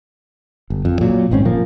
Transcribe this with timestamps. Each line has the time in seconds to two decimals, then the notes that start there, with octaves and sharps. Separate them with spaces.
0.70 G1
0.85 F2
1.01 A#2 F#3
1.31 G#1 G#2 C4 C#4
1.45 A#2 F3 A#3